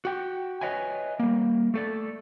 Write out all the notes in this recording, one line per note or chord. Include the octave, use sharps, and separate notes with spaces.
F#4 G5
B4 C#5 D#5 E5 G#5
G3 A#3
A3 A4 D5